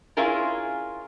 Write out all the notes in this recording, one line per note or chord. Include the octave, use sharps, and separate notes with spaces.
C#4 E4 F4 G#4 A#4